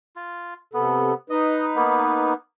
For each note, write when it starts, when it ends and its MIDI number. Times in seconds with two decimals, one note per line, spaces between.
0.16 0.54 65
0.74 1.12 48
0.74 1.14 59
0.74 1.12 69
1.30 2.33 63
1.30 2.33 71
1.30 1.65 75
1.76 2.34 58
1.76 2.34 59